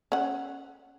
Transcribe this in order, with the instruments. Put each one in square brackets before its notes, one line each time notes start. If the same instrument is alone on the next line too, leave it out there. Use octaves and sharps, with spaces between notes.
[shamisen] C#4 F#5